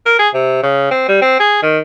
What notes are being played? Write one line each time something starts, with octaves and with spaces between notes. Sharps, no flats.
A#4
G#4
C3
C#3
C4
G3
C4
G#4
D#3